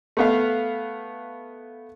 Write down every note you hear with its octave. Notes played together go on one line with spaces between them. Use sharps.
A3 B3 F5